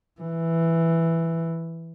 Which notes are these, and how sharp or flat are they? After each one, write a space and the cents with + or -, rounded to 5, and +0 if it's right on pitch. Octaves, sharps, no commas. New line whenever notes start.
E3 +5